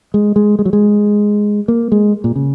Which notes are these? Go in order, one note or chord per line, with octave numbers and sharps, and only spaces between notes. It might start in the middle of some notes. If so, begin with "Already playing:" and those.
G#3
G#3
G#3
F#3
G#3
A#3
G#3
A#2
C#3